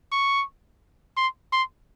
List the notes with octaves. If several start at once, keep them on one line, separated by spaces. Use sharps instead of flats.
C#6
C6
C6